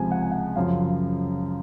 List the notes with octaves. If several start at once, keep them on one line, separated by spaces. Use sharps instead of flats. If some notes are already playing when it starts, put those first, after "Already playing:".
Already playing: C#2 C3 F3 G#5
F#5
G#5
F#5
F#2 C#3 F3 F5